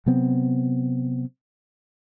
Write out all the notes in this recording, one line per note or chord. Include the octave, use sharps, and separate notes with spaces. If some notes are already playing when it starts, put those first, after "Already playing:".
C3 F#3 B3 C4